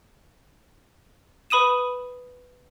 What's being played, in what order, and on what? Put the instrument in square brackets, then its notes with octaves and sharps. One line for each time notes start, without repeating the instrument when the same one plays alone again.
[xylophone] B4 B5 D#6 D#7 E7